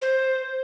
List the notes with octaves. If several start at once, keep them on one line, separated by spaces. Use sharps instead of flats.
C5